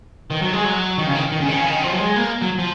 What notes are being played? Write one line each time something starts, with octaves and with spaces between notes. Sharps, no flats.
D#3
F#3
G#3
F#3
D#3
C#3
D#3
D#3
C#3
D#3
C#3
D#3
F3
F#3
G#3
A#3
F#3
F3